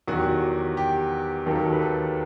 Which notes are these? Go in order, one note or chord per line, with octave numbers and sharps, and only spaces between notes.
E2 D#3 F#3 F#4
G4
F#4
G4
D#2 D#3 F#3 A4
G4
A4
B4
A4